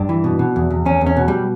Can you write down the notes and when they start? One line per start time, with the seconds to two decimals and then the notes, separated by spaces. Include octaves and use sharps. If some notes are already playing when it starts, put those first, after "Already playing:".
Already playing: G2 D4
0.09 E3
0.24 B2
0.39 B2
0.56 E2
0.70 E2
0.85 E2 C#4
1.01 E2
1.06 C#4
1.16 B2
1.28 G3